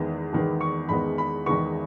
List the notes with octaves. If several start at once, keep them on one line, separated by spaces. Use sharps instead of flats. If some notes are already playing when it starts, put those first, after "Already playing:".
Already playing: E2 D#3 G#3 B3
E2 D#3 G#3 B3
C#6
E2 D#3 G#3 B3 B5
B5
E2 D#3 G#3 B3 C#6